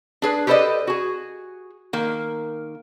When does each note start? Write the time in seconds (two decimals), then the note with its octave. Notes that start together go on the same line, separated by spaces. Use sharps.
0.22 D4 G#4 B4
0.47 G4 A4 B4 C5 D5 D#5
0.87 F#4 G#4
1.93 D#3 A#3